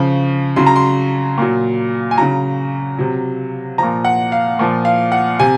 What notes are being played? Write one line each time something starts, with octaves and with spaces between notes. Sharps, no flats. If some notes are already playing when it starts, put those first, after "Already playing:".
Already playing: C#3 F3
C#3 F#3 C6
A#5
C6
A#2 F#3
G#5
C#3 F#3 A#5
C3 F#3
A#2 F3 A#5
F#5
F5
A#2 F3
F5
F#5
C3 G#5